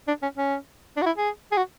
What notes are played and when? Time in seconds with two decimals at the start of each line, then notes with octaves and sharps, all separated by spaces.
0.08 D4
0.23 C#4
0.37 C#4
0.97 D4
1.02 F#4
1.06 E4
1.17 G#4
1.52 G#4
1.57 F#4